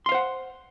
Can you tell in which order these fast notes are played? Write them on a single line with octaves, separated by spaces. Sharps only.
C6 F5 C5 F#5